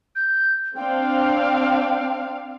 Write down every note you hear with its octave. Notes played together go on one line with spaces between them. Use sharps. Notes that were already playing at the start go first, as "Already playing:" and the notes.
G6
C4 D4 F5 G5